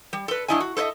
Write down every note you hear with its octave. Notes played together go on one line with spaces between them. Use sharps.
G3
A4 B4
G2 D4 E4 D#5 G#5
F#4
A4 C5 C#5 D#5 E5